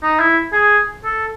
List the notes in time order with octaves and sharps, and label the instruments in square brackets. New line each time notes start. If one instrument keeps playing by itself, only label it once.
[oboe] D#4
E4
G#4
A4